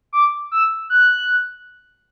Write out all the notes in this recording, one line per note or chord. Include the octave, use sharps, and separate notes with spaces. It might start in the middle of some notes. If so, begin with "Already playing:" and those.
D6
E6
F#6